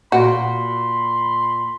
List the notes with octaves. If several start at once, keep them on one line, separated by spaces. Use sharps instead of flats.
A#2 F#4 B5 C6